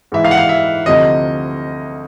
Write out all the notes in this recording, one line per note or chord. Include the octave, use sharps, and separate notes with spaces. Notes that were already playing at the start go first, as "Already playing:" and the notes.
G#2 E3 E5
F5
F#5
F5
E5
D2 C3 F3 D#5